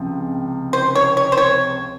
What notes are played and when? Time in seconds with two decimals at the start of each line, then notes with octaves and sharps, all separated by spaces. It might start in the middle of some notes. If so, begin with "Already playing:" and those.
Already playing: C#2 C3 F3
0.73 C5
0.95 C#5
1.17 C#5
1.32 C5
1.37 C#5